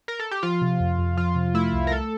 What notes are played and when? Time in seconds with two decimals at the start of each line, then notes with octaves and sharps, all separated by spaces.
0.08 A#4
0.20 A4
0.31 G4
0.43 F3 F4
0.62 C3
0.80 F2
0.99 F2
1.17 F3 F4
1.36 C3
1.54 A3 E4
1.73 C2
1.87 A#4
1.91 A3 A4